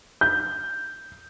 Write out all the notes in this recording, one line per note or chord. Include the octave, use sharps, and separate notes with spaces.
G6